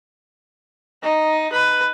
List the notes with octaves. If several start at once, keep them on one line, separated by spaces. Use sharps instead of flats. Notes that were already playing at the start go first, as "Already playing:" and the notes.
D#4
B4